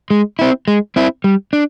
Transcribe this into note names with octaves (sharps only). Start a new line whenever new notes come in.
G#3
C4 E4
G#3
C4 E4
G3
D4